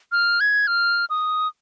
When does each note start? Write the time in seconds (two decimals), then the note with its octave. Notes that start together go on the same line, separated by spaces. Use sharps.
0.12 F6
0.40 G#6
0.67 F6
1.10 D#6